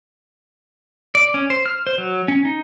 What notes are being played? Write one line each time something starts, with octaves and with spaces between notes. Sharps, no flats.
D5
C#4
C5
F6
C5
F#3
C#4
D#4